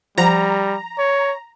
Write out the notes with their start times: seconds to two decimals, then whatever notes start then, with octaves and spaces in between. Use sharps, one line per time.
0.18 F3 G3 C5 F#5 A#5
0.99 C#5